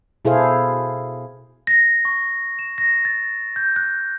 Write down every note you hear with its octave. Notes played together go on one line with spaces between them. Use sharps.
B2 E4 G#4 A4 C5 F5
A#6
C#6
E7
A#6
A6
G6
F#6